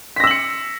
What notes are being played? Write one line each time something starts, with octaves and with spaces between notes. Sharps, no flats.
E6 A#6 B6 C#7 F#7